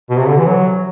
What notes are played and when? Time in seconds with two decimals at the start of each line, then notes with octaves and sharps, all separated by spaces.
0.10 B2
0.19 C3
0.28 D3
0.37 E3
0.47 F#3